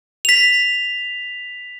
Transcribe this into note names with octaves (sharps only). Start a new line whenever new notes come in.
B6 F7